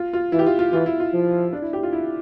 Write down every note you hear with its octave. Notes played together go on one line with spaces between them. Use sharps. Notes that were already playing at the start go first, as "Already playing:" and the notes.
Already playing: F4
F4
E3 E4
G4
F4
F4
E3 F4
E4
F4
F3
D4
E4
G4
F4
E4